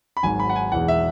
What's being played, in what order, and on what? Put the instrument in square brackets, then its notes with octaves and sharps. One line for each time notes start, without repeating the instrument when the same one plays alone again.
[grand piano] B5
G#1 G#2 F#3 G#5
B5
F#5
G#5
E1 E2 E3 F#5
E5